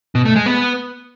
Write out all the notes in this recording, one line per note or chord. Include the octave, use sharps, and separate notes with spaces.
B2
A3
G#3
B3